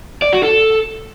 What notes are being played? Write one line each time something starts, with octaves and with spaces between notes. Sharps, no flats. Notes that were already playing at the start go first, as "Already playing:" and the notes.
D5
F#4
A4